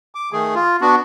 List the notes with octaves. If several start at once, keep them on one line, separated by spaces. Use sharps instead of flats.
D6
D#3 A3 G#4
F4
B3 D4 F#4